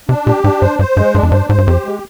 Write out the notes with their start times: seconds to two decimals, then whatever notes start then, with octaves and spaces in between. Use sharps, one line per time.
0.09 C3 D4
0.26 A#2 G4
0.44 G#2 D4
0.62 G2 C5
0.79 G2 C5
0.97 G2 G#3
1.14 G2 D4
1.23 F2
1.32 G2 C5
1.49 G#2 C5
1.58 G2
1.67 F2 G4
1.85 G#3